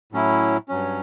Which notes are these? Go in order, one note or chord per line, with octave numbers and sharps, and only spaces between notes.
A2 F#3 C#4 E4
G2 F#3 C#4